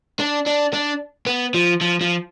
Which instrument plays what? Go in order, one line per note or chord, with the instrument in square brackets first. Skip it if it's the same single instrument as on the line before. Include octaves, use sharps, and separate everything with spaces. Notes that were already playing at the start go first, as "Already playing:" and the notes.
[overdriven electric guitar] D4
D4
D4
B3
F3
F3
F3